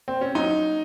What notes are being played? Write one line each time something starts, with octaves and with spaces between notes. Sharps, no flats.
C4
C#4
F#3 D#4